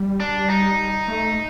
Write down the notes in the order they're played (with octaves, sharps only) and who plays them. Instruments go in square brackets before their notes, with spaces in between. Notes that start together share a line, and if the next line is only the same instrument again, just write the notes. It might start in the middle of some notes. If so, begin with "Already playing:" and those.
Already playing: [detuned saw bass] G3
[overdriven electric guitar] D4
D#4
[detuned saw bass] A3